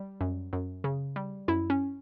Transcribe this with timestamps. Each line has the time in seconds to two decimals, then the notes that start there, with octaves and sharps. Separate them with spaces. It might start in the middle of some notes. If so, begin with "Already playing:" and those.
Already playing: G3
0.21 F#2
0.53 F#2
0.84 C#3
1.16 G3
1.48 F#2 E4
1.70 C#4